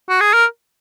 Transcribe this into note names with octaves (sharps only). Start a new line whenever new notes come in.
F#4
G#4
A#4